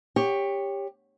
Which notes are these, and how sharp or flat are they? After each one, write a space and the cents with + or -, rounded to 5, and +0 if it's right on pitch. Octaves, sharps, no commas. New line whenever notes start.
G4 +15 C#5 +0